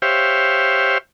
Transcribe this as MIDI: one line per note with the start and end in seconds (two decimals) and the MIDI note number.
0.02 0.98 67
0.02 0.98 72
0.02 0.98 73
0.02 0.98 76
0.02 0.98 77
0.02 0.98 79